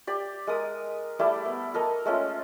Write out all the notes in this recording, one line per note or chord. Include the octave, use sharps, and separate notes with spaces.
G4 D5
G#3 A#4 D#6
G3 A3 E4 D5
B3
A4 A#4 D#5 A5
G#3 A3 C#4 F4